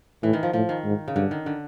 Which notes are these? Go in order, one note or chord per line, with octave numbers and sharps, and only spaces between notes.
A2 E3
D#3
F3
A2 F3
D#3
G#2
C#3
G2 D3
D#3
D3